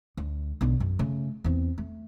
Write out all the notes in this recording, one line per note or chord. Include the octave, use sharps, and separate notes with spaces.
D2
B1 D3
F#2
C#3 A3
E2 C4
A3